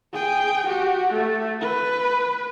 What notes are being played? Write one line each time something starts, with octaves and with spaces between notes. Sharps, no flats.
G#4 G5
F#4 G4
A3
B4